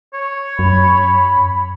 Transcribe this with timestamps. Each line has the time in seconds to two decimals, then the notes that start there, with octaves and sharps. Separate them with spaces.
0.13 C#5
0.59 F#2 B5